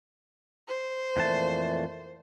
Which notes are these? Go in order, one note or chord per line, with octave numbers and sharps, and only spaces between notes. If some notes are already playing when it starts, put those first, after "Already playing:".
C5
F2 A#2 E3 A3 A5